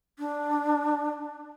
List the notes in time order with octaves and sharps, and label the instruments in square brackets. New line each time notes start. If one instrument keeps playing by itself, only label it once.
[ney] D4